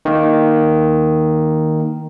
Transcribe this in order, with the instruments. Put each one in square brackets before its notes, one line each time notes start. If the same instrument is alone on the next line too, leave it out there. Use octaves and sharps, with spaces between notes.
[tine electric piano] D#3 A#3